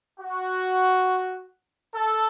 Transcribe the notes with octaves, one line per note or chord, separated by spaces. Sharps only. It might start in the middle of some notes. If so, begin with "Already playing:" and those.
F#4
A4